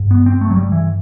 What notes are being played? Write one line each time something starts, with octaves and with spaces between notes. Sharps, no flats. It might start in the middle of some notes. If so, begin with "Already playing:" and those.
Already playing: G2
B3
C4
A3
F#3
G3
E3